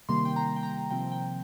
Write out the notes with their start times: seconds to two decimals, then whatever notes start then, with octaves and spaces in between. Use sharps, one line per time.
0.09 C3 D#3 G3 A#3 C6
0.25 G5
0.36 A#5
0.56 G5
0.63 A#5
0.91 C3 F3 C4 G5
1.12 G5